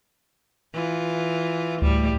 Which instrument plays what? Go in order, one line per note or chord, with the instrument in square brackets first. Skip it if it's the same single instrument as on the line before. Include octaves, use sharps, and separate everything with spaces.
[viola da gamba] E3 F4
[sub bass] D2 [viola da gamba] A2 G3